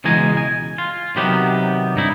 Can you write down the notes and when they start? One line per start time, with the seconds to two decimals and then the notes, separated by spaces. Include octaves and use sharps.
0.04 C#2 B2 E3 G#3 G#5 A#5
0.37 G#5
0.78 F4
1.16 C3 D#3 F#3 B3 G4
1.95 G2 D#4 E4